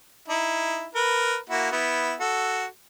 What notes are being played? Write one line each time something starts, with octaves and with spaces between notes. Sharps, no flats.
D#4 E4
A#4 B4
A#3 E4 F#4
B3 E4
F#4 A4